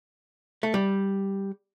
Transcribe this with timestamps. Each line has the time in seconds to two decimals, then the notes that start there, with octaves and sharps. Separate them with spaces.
0.63 A3
0.74 G3